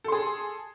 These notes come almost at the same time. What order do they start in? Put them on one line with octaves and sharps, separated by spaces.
A4 C6 G#4